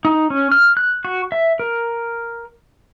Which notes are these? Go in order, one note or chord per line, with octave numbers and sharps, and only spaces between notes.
D#4
C#4
F6
F#6
F#4
E5
A#4